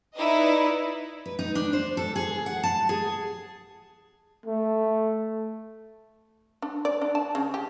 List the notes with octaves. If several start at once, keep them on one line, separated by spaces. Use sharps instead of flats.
D#4 E4 B4 D5 D#5
B4
D#4
D4
C5
A4
G#4
F#5
A5
G#4
A3
D4
D5
D4
A5
C#3
G4